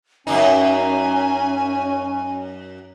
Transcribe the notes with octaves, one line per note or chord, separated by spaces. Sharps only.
F#2 A2 C#4 D#4 G#5